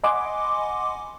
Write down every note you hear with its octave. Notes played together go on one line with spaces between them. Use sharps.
D#5 F#5 G#5 B5 C6 D6